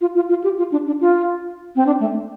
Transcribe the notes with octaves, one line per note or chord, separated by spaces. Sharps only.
F4
F4
F4
G4
F4
D4
D4
F4
C4
D4
A3